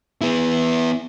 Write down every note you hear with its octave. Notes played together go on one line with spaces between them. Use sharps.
B3 E4